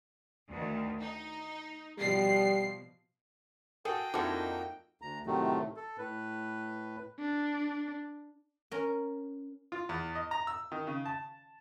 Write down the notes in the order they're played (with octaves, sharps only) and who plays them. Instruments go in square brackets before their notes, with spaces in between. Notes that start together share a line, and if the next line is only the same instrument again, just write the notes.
[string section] D2 D#3
D#4
[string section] B2 F3 C7 [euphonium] G3
[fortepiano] F#4 A4 [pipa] G#4 [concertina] G5
[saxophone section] F2 A#3 D#4 [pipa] D3 E4 [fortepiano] F3 F#4 A4
[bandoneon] D2 A#5
A2 C3 D#3 F#3 A3
A4
A2 B4
[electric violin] D4
[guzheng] C#4 A#4
[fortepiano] F4
E2
D#5
A#5
E6
D#3
C#3
A5